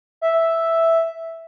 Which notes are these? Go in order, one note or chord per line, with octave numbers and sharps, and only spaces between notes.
E5